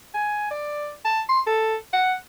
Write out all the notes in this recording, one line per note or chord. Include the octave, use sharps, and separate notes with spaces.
G#5
D5
A5
C6
A4
F#5